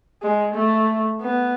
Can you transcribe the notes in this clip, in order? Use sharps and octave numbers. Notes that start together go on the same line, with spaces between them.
G#3
A3
B3